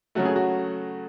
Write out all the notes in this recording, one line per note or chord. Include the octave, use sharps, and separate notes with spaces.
C#3 F#3 A3 F#4
G#4
F#4